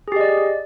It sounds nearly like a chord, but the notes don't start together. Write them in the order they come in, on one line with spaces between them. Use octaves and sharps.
G#4 G4 D#5 D5